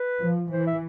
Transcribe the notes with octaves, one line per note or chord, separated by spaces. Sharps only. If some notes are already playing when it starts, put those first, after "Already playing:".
Already playing: B4
F3
E3 C5
E5